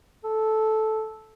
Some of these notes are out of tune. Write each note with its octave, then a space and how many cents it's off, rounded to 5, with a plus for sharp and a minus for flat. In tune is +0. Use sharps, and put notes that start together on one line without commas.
A4 -10